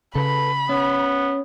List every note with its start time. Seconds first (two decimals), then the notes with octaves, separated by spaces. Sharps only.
0.15 C#3 A4 B4 B5
0.69 B3 C#4